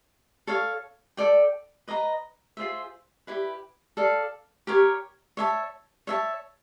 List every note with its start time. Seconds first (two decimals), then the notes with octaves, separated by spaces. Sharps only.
0.47 A4 C#5 F5
1.17 A4 D5 G5
1.88 B4 D#5 G5 A#5
2.57 F4 G#4 C5 E5
3.27 E4 G4 B4
3.97 A4 D5 F5
4.67 G4 A#4 C#5
5.37 C#5 E5 A5
6.07 C#5 E5 A5